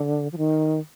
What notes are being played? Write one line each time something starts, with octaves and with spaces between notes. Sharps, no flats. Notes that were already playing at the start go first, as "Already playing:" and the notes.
Already playing: D3
F3
D#3